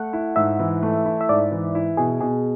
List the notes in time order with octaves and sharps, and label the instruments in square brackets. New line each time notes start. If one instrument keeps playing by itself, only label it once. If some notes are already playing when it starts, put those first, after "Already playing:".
Already playing: [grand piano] A3 [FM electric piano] F#5
[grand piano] E4
[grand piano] G#2 [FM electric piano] E5
[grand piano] E3
A3
E4
[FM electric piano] E5
[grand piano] G#2 [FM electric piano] D5
[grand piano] E3
E4
[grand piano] B2 [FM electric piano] G#4
[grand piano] B2 [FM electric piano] G#4